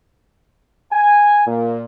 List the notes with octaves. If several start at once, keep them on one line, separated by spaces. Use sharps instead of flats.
G#5
A#2